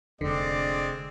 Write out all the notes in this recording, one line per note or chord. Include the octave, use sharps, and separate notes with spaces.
F1 D3 G#3 C4 D5